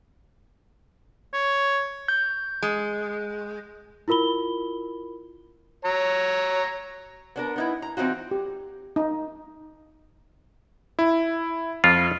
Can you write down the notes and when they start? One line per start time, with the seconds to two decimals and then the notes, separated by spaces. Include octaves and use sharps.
1.33 C#5
2.08 G6
2.62 G#3
4.08 E4 F4 A#4 B5 G7
5.85 C#5 A#5
7.36 B3 D4 A#4
7.56 B3 D#4 E4
7.82 A#5
7.97 E3 C4 D#4 F4 F#4
8.31 G4
8.96 D#4
10.99 E4
11.84 F2 F4